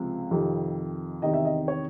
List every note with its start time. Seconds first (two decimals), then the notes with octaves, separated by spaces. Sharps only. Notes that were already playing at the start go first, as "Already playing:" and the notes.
Already playing: C#2 C3 F3
0.31 F2 C3 D#3
1.22 E2 C3 D#3 D#5
1.33 E5
1.45 D#5
1.68 C#5